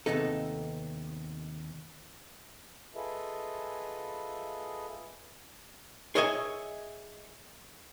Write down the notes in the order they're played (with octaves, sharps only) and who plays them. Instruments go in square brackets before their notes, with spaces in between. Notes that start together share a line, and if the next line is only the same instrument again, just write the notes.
[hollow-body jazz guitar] D#2 C3 B3 D#4 A4
[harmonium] F4 G#4 A4 B4 D#5 E5
[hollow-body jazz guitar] G#4 C#5 D#5 E5 G5 G#5